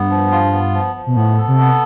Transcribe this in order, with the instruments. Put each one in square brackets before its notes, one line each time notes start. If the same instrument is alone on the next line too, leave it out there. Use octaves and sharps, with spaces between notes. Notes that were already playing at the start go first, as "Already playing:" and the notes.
Already playing: [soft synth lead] G2 [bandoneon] B3
[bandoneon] F3
F4
B3
F3
F3
[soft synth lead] B2
[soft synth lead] A2 [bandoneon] B3
[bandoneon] A4
[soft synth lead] C3
[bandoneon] B3